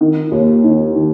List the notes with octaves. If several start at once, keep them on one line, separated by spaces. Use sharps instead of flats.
D#3
D#2
D#3
D#3